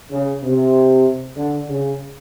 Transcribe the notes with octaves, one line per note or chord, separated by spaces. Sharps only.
C#3
C3
D3
C#3